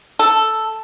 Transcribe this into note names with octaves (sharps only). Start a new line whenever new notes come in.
A4